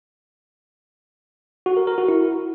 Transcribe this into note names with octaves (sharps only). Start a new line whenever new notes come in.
F#4
A#4
A#4
F#4
E4